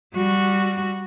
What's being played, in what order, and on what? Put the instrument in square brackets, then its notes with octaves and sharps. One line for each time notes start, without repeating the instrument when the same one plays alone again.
[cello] G3 F#4